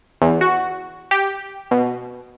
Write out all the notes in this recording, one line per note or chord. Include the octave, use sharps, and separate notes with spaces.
E2
F#4
G4
B2